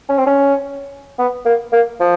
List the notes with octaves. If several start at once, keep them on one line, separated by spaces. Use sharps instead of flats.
C#4
C4
C#4
B3
A#3
A#3
F3